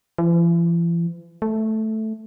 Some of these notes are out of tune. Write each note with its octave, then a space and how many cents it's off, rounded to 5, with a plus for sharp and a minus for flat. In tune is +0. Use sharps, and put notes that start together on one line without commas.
E3 +45
A3 -5